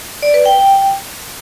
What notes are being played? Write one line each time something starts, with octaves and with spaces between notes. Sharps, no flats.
D5
B4
G5